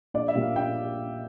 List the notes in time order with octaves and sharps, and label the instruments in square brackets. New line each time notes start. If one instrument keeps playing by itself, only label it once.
[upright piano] A#1 D5
E5
A#2 G3
F5
A#1 G5